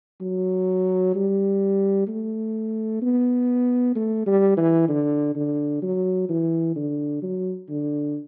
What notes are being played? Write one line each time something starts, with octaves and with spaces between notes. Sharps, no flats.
F#3
G3
A3
B3
A3
G3
E3
D3
D3
F#3
E3
D3
F#3
D3